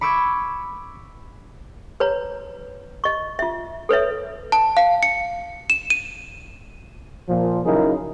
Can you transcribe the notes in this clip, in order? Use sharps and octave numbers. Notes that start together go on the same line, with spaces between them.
B5 C#6 D6 E6 G#6
B4 C#5 A#5
D#5 C#6
F4 E5
A4 B4 C#5 E5
A5
F5
C#7
E7
D#7
A#2 F3
C#3 F#3 D#4 E4 G#4 A#4